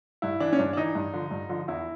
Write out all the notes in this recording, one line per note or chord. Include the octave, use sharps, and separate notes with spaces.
G2 E4
E3 D4
C#4
G2 D4
D4
E3 D#4
G2
D3 F3
G2
D3 F3
E2 E4